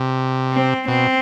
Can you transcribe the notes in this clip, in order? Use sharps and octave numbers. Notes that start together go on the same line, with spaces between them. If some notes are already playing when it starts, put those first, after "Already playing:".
Already playing: C3
C4
B2 C4